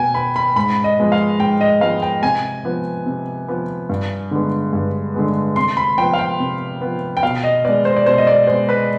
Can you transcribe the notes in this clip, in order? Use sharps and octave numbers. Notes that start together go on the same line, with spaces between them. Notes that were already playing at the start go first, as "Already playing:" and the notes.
Already playing: B2 B3 G5 G#5
B3 B5
B5
G#2 B5
D#5
F3 G#3 B3
F5
G#2 G5
D#5
F3 G#3 B3 F5
G5
C3 G#5
F3 B3
C3
F3 B3
G2
D3 G#3 B3
G2
D3 G#3 B3
C3 C6
B5
F3 B3 G5
F5
G5
C3
F3 B3
G5
B2 F5
D#5
G#3 B3 D5
C5
D5
B2 C5
D#5
D5
G#3 B3 C5
B4